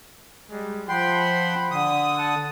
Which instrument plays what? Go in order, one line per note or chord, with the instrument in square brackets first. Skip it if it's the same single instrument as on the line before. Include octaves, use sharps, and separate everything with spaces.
[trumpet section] G3 G#3
[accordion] F3 G5 C6 [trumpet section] C5 F#5 B5
[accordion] D3 D#6
[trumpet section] F#5 A5